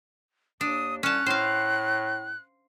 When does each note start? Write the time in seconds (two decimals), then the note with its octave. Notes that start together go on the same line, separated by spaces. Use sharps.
0.61 D#2 D4 D#6
1.03 C2 C#4 A5 F#6
1.26 A2 C5 F5